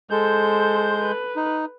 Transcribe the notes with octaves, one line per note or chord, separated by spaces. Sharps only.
G#3 A4 C5 G6
B4
D#4